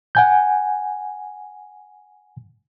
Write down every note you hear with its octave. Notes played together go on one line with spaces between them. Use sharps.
F#5 G#5 G6